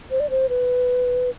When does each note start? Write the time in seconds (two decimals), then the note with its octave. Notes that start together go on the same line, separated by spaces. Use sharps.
0.11 C5
0.20 D5
0.30 C5
0.49 B4